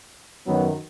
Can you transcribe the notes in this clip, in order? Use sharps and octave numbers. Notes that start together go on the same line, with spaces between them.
F#2 D#3 F#3 B3